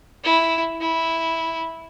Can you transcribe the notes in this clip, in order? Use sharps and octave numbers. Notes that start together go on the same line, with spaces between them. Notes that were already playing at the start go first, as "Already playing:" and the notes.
E4
E4